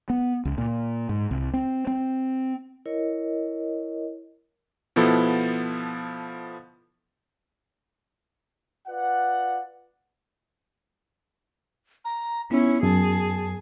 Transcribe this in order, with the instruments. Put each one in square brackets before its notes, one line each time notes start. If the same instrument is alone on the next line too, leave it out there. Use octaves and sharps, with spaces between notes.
[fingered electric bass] B3
C#2
A#2
G#2
C2
C4
C4
[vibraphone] E4 A#4 C#5 D#5
[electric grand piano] B2 F3 B3 E4 A4
[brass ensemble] F4 B4 D5 F#5
[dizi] A#5
[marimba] B3 D#4 [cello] C#4 [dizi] E4
[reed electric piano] F#2 [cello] G#4 [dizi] A5